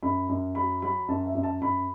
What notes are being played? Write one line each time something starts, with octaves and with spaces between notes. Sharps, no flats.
F#2 B5
F#2
F#3 B5
F#3 B5
F#2 A5
E5
F#2
A5
F#2 B5